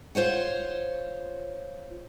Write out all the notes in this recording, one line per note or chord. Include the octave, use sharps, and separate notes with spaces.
F4 C5 C#5 F#5